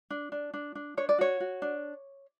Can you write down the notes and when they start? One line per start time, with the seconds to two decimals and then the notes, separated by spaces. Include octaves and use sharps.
0.10 D4
0.32 D4
0.54 D4
0.75 D4
0.97 D4 C#5
1.09 D5
1.18 F#4 C#5
1.40 F#4
1.62 D4